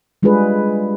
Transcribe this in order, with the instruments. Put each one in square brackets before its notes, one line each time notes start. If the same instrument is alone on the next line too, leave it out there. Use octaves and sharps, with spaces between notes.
[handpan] G3 G#3 D4 F4 G#4 B4